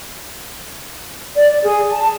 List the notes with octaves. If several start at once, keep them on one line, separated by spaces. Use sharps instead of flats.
D5
G#4
A5